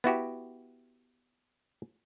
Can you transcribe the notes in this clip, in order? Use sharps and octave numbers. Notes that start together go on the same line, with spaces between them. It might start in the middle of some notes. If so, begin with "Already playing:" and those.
B3 E4 F#4 G4